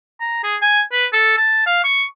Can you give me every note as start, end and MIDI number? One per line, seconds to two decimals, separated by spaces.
0.20 0.42 82
0.44 0.56 68
0.62 0.81 80
0.92 1.06 71
1.13 1.37 69
1.38 1.66 81
1.66 1.83 77
1.84 2.03 85